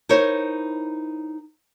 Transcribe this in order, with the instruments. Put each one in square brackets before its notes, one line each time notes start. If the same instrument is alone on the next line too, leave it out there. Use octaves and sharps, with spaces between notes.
[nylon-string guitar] D#4 E4 A#4 C5 C#5